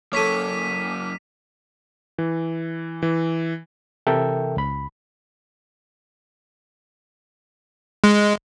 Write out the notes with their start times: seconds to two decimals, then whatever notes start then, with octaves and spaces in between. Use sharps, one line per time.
0.13 F#2 A#3 A4 C#5 D6 B6 D#7
2.18 E3
3.03 E3
4.07 C3 E3 A4 A#4 E5 G5
4.57 C#2 B5
8.04 G#3